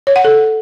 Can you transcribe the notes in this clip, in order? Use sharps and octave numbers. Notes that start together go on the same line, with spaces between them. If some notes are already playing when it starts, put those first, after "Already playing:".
C#5
F#5
A4